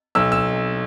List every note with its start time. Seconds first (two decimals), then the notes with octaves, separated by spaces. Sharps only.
0.15 B1 E6
0.32 E6